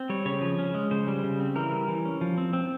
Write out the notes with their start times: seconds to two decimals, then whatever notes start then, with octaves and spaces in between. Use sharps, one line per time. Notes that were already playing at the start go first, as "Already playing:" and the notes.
Already playing: C4
0.10 G3 C#5
0.25 C#3 C#5
0.42 F3
0.59 C#4
0.74 G#3
0.91 C#3 C5
1.08 G3
1.24 C#3
1.40 C4
1.56 E3 A#4
1.72 G3
1.88 E3
2.05 C#4
2.21 F3
2.38 C4
2.53 C4